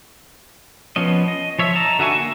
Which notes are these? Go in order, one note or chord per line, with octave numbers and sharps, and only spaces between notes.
F3 B3 C#4 D#5
D#5
F3 C#5 E5
D#4 A5 A#5
D3 F#4 E5 G#5 C#6
A#3